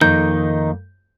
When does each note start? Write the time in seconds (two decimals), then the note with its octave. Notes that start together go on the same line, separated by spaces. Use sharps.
0.01 F2 D#3 A#3 D#4 G6